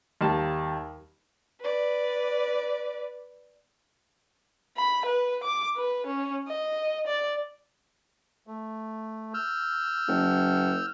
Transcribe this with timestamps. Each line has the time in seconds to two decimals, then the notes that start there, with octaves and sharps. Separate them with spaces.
0.21 D#2 G3 A5
1.61 B4 D5
4.77 B5
5.06 B4
5.44 D6
5.76 B4
6.07 C#4
6.48 D#5
7.07 D5
8.47 A3
9.34 E6 F6 G6
10.08 F#1